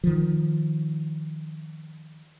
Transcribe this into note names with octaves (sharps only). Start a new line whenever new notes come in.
D#3 F3